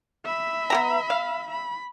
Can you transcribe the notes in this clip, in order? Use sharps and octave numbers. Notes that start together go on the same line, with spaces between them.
E5 B5
B3 G4 A#5
F5
B5